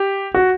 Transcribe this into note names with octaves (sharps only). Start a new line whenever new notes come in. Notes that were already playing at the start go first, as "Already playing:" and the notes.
Already playing: G4
F#4